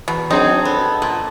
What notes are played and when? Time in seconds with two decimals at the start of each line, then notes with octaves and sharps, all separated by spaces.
0.08 E2 B2
0.30 F#3 C4 D4 D#4 G#4
0.65 B3 A4
1.02 A#2